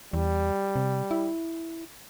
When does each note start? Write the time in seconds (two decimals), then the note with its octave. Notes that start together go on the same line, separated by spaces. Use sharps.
0.13 E2 G3
0.76 C3
1.11 E4